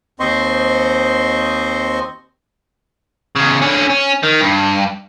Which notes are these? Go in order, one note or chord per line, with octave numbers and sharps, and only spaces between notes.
D#2 C4 C5 D#5 C6 C#6
E2 C#3
D3 C#4
C#4
D#3
G2